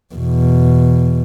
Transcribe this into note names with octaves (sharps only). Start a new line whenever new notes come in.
E2 B2